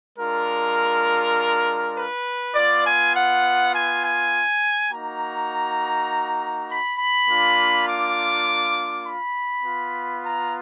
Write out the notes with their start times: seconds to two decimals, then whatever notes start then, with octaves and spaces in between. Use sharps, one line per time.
0.19 G#3 D4 F4 A#4
1.97 B4
2.55 B3 F4 D5
2.85 G#5
3.15 F#5
3.74 G#5
4.03 G#5
4.91 A#3 D#4 F#4 A#5
6.70 B5
6.99 B5
7.29 A#3 D4 F4
7.87 D6
9.06 B5
9.64 B3 F4
10.24 A#5